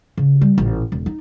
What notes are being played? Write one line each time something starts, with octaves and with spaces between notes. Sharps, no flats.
C#3
G3
A1 A#2
E1
D#4